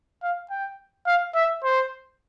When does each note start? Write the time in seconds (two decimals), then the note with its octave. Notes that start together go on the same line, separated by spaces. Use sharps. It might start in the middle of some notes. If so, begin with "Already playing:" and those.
0.23 F5
0.50 G5
1.06 F5
1.35 E5
1.64 C5